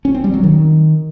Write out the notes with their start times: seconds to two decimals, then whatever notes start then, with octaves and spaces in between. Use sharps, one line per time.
0.05 C#4
0.14 C4
0.24 G3
0.34 F#3
0.43 D#3